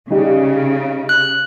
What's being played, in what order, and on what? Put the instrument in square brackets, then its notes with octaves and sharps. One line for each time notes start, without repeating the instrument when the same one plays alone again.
[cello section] C#3 [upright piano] G3 D#4 G4
[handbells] F#6